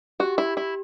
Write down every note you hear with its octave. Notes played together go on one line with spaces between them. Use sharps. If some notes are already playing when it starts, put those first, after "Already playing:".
F#4 G4
E4
G4
E4